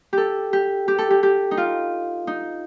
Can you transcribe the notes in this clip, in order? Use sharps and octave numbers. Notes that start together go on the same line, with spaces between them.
G4 A4
G4
G4
A4
G4
G4
D#4
F4
D#4